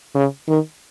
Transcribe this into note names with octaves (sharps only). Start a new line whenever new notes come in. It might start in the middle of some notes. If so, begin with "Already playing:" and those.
C#3
D#3